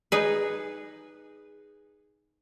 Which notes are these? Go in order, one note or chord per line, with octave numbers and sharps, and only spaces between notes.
D#4 G#4 B4